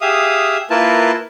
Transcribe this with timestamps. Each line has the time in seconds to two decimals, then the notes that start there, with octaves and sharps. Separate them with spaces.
0.01 G4 G#4 E5 F5 D#6
0.70 A#3 E4 F4 A#4 B4 A5